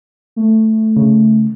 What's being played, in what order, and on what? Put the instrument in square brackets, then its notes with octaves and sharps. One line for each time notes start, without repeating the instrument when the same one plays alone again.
[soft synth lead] A3
[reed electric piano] C#3